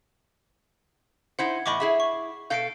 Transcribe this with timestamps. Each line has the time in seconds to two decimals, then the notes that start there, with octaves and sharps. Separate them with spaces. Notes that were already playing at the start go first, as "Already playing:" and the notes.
1.39 D#4 E4 C5 F#5
1.66 E2 A2 D#5 B5 C#6 D6
1.80 E4 G#4 E5
2.00 C#6
2.50 B2 A4 F5 G6 C7 D7